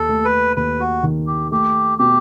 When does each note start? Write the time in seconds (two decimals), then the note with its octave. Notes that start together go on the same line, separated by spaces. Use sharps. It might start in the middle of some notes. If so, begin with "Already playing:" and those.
Already playing: D#2 A4
0.09 A3
0.25 B4
0.56 D#2 B4
0.80 F#4
1.03 D#3
1.27 G4
1.51 A3 G4
1.99 B2 G4